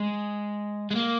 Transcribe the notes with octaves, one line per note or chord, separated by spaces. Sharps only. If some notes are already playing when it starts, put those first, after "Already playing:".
Already playing: G#3
G#3
A#3